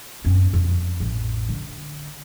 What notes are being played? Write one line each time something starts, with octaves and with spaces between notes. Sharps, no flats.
F#2 C4
F2
A1
D3